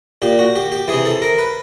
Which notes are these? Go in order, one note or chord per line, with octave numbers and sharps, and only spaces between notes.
A#2 G4
F#4
G4
G4
C3 E3 G#4
A4
A#4
B4